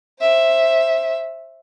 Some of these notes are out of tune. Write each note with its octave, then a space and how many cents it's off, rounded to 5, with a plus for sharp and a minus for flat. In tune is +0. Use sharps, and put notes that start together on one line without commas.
C5 +25 E5 +0